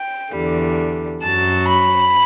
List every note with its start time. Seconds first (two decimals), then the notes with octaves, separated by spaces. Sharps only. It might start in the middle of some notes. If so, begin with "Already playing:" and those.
Already playing: G5
0.35 E2 D3 G3
1.24 F#2 F#3 A5
1.69 B5